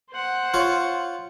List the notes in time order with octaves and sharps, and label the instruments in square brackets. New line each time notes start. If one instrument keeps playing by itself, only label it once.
[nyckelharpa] C5 F#5
[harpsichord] F4 C#5